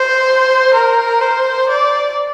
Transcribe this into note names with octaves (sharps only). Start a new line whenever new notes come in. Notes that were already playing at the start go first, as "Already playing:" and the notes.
Already playing: C5
A#4
C5
D5